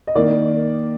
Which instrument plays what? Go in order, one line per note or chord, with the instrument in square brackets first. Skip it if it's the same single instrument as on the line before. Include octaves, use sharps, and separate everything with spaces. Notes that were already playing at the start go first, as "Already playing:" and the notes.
[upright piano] D#5
D#3 A#3 D#4 D5